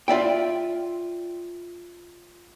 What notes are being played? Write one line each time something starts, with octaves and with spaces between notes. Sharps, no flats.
F4 D5 E5 G5